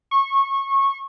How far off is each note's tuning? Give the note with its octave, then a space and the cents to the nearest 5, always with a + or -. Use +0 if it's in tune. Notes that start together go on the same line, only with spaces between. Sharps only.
C#6 -20